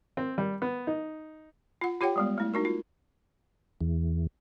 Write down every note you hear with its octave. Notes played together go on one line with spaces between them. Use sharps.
C4
G3
B3
D#4
F4 F#5
F4 G4 C#5 F#5 G5
G3 G#3 B3
A3 E4
D#4 F#4 A#4
F4
E2